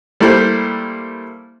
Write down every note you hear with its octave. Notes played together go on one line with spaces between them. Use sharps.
G3 A3 A#3 E4 C5